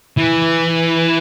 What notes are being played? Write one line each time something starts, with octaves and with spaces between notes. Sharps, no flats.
E3